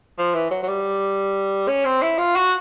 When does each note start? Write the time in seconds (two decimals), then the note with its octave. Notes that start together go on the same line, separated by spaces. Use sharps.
0.18 F3
0.34 E3
0.51 F#3
0.63 F#3
0.68 G3
1.68 C#4
1.85 C4
2.02 E4
2.18 F4
2.36 F#4